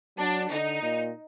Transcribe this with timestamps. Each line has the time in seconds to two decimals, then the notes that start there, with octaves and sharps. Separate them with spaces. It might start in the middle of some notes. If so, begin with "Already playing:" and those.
0.18 F#3 D4
0.51 D3 D#4
0.83 A#2